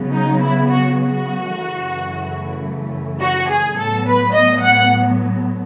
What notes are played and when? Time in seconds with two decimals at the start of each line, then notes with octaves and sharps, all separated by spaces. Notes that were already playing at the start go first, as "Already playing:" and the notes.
Already playing: C#3 F#3 B3
0.12 D#4
0.39 E4
0.68 F#4
0.96 F#4
1.52 F#2 C#3 E3 A3
3.20 F#4
3.49 G#4
3.77 A2 F#3 B3 A4
4.05 B4
4.33 D#5
4.61 F#5